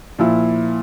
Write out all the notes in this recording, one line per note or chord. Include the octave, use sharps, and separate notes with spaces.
A#2 F3 E4